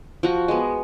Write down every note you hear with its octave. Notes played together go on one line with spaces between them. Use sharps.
F3 F#4
G#3 B3